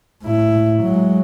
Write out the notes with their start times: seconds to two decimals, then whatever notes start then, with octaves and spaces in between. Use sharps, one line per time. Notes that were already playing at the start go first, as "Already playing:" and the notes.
0.23 A2 E4
0.84 F#3 G#3